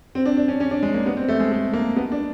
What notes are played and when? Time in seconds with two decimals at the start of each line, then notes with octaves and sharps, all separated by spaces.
0.15 C4
0.26 D4
0.37 D4
0.48 C#4
0.60 C#4
0.71 D4
0.83 G#3
0.94 A#3
1.06 B3
1.17 C4
1.29 A3
1.40 G#3
1.52 A3
1.73 A#3
1.96 B3
2.12 D4